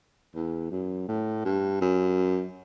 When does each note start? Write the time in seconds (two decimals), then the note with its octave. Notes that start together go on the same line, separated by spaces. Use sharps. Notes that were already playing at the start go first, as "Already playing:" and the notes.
0.35 E2
0.71 F#2
1.08 A2
1.45 G2
1.81 F#2